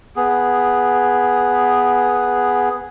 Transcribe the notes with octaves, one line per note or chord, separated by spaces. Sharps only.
B3 G#4